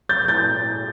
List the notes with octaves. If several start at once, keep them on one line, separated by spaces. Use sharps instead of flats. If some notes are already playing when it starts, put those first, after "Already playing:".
G6 A6
G6 A6